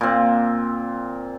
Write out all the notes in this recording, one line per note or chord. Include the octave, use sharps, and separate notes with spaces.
A#2 C4